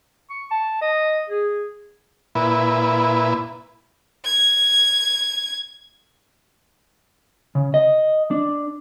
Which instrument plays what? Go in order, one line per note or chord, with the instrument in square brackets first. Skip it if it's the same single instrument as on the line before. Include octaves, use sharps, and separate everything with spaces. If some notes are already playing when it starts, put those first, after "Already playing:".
[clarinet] C#6
A5
D#5
G#4
[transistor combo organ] A#2 E4 B4
[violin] G#6
[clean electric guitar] C#3
D#5
D4